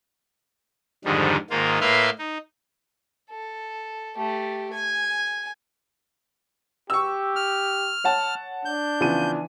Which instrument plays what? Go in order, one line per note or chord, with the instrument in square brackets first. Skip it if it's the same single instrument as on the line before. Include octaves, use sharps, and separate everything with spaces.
[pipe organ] F2 G#2 D3 D#3 G3
G#2 D#3 A#3 F4
A2 A#3 B4 E5 F5 C6
D#4
[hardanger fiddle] A4
A3 G4
G#5
[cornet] G4 [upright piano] C#6 E6
[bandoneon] F6
[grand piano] C#5 F#5 A5
[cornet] D4 [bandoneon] G6
[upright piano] C#3 F3 B3 [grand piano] E3 D#7